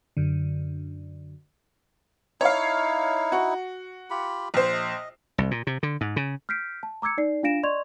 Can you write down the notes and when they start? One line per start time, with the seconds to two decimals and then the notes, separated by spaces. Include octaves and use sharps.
0.17 F#2 D3
2.41 D#4 E4 C#5 F5
3.32 F#4
4.10 F4 G4 B5
4.54 A#1 C5
4.73 D#5
5.38 C2
5.51 A#2
5.67 C3
5.83 D3
6.01 G#2
6.16 C#3
6.49 F6 G6 B6 C7 D7
6.83 A5
7.02 A#5 D6 E6 G#6 C#7
7.17 D#4 D5 C7
7.43 D4 F4 F5 A#6 D7 E7
7.63 D5 D#5 C6 C#6 G#6 F7